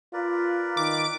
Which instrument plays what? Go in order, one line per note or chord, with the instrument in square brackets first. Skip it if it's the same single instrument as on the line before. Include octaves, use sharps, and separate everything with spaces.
[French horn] F4 [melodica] A#4 B4 D5
[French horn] D#3 [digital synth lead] D6